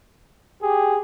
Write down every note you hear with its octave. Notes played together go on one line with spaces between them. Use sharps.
G4 G#4